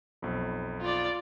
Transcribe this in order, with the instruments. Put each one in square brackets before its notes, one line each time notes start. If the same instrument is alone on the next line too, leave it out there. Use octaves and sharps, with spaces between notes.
[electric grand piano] B1 F2
[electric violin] F4 D5